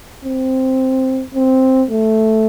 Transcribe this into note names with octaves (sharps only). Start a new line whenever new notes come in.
C4
C4
A3